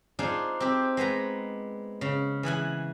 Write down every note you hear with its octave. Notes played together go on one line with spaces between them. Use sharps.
D4 D#4 F4 G#4 C5
C4 G4
G#3 B3 B4 A#5
C#3
E3 G#4 F#5 G#5